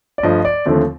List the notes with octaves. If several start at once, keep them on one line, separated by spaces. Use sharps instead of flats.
D5
G2 F3 A3 D#5
D5
D#2 D3 F3 A3 C4